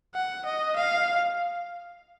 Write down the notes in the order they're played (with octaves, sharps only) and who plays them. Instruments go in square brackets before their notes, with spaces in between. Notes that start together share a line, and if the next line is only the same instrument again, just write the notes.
[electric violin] F#5
D#5
F5